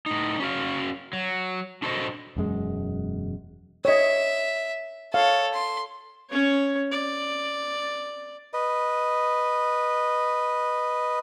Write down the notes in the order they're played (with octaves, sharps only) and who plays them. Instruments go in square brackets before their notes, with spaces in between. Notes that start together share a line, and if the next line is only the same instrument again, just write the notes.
[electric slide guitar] A2 D#4
C#4 F#4 F5
F#3
D4 F#4 A4 C5 C#5 D#5
[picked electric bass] E1 F#2 G#3
[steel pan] C#5 D#5 [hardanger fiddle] E5
[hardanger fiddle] A4 C#5 [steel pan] F5
[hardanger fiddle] C6
[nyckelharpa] C#4 C#5
D5
[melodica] B4 D#5